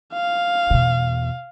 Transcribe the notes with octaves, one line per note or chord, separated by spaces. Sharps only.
F5
E2 B2